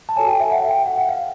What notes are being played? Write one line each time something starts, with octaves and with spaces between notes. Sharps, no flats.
A5
F#4 A4 C#5 G#5
G5
E5
F#5
G5
F#5
F#5
F5